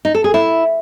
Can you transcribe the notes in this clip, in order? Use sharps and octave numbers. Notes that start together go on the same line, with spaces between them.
D#4
A4
G#4
E4